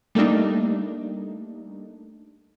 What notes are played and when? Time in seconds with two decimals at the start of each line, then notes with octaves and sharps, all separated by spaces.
0.15 G3 A3 A#3 D4 D#4